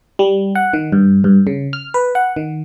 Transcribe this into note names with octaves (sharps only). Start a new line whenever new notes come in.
G3
F#5
D#3
G2
G2
C#3
F6
B4
F#5
D#3